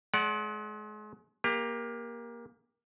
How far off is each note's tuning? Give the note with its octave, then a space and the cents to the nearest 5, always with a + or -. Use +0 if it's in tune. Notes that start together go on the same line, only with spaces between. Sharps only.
G#3 +35 D5 -15 F#5 +0
A#3 +20 G4 +35